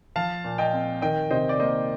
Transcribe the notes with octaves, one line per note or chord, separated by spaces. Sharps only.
F3 F5 A5
A#2
D#5 G5
C4
D#3 D#5 G5
C3 C5 D#5
D5
A#3 C5 D#5